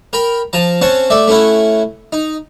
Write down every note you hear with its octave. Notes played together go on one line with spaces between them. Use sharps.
A#4 G5 B5
F3 A5 A#5
C4 C#4 F#5 A5
A3 D5 E5
A3 C#4 E4 F#5
D#4